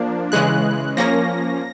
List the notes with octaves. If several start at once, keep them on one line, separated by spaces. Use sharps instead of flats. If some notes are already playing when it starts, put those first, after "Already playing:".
Already playing: F3 A#3 D4
C#3 E3 G#3 F#6
F3 A#3 C#4 A#6